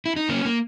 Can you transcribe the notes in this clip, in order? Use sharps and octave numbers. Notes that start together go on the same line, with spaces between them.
E4
D#4
C#3 A#3 C#4
A#3